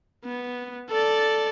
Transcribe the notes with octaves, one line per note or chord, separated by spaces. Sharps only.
B3
A4 D5